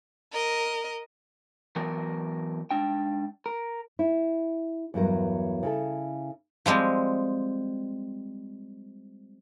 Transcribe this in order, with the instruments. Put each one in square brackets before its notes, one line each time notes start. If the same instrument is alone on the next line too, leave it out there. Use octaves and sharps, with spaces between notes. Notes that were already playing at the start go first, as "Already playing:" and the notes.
[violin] A#4 D#5
[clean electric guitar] E3 F#3 B3 A#4 D5
G#2 D4 G5
A#4
[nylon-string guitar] E4
E2 G2 F#3 A#4
C#3 E4 A4
[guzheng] F3 G3 G#3 C4